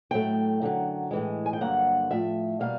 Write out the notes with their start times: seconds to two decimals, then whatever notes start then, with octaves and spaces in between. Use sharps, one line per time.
0.11 A2 F#3 A3 G5
0.62 F#2 D3 F#3
1.11 A2 E3 G#3
1.46 G#5
1.53 G5
1.61 G2 D3 F#3 A#3 F#5
2.11 A2 F3 A3 E5
2.60 B2 G3 A#3 F5